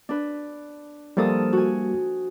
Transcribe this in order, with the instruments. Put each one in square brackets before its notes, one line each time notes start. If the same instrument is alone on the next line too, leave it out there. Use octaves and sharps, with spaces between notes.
[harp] D4 B4
[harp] F3 A4 D#6 [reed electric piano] G3 A#3
[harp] F#4 G#5